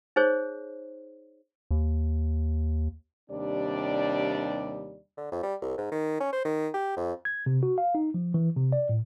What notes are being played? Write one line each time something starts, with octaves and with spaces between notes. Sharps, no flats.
D#4 G#4 C5 C#5
D#2
D#2 C3 G3 D4 D5
D3
F2
G3
C2
G#2
D#3
C#4
C5
D#3
G4
F2
G#6
C3
F#4
F5
D#4
F3
E3
C3
D5
A2